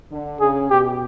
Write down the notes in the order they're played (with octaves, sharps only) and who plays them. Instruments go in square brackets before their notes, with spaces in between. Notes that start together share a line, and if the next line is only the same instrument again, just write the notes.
[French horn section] D3
[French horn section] C#3 [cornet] G#4
[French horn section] B2 [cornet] G4